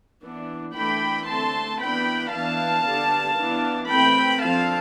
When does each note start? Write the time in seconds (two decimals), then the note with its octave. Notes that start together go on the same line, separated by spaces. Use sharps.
0.22 E3 B3 D4
0.75 E3 A3 D4 G5 B5
1.27 D3 A3 C4 A5 C6
1.80 E3 B3 D4 G5 B5
2.32 E3 B3 D4 F5 A5
2.85 D3 G3 B3 D4
3.36 E3 B3 D4
3.89 E3 A3 C4 G5 B5
4.41 D3 F3 C4 F5 A5